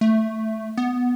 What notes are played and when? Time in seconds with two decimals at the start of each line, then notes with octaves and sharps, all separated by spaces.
0.01 A3
0.77 B3